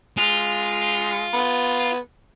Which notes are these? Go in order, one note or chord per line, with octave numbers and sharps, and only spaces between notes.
G#3 F4
B3